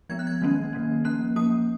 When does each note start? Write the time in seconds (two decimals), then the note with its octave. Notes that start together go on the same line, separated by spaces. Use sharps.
0.09 F3 G#3 B3 G#6
0.19 F#6
0.27 G#6
0.42 D#3 F#3 A#3 C#4
0.73 D#3 F#3 A#3 C#4
1.05 F3 A#3 C#4 F#6
1.36 F3 A#3 C#4 D#6